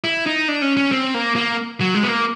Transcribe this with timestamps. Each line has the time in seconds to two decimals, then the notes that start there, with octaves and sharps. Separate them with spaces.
0.04 E4
0.26 D#4
0.48 D4
0.62 C#4
0.77 C#4
0.92 C4
1.14 A#3
1.36 A#3
1.80 F#3
1.94 G#3
2.03 B3
2.09 A#3